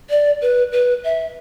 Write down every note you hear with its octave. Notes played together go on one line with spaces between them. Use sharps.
D5
B4
B4
E5